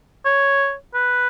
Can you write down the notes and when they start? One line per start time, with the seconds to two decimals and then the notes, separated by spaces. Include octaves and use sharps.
0.25 C#5
0.94 B4